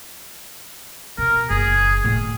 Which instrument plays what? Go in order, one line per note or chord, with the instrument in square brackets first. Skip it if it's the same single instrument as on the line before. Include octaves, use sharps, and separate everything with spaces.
[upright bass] B2 [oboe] A#4
[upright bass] F#1 [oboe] G#4
[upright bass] A2 D3